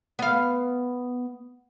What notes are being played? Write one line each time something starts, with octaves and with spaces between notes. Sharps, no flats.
B3 F5